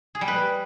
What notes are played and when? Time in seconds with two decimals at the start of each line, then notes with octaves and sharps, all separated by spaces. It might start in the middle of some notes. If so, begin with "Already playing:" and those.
0.15 G#4
0.21 G3
0.28 B4